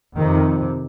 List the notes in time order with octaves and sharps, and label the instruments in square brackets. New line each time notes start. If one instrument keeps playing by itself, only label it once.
[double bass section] F2 C3 D#3